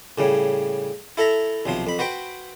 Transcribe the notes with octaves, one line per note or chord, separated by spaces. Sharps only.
A2 C#3 G3
E4 A4 E5 A#5
B1 C3 F3 C6
F2 B5
F#4 B4 C5 G5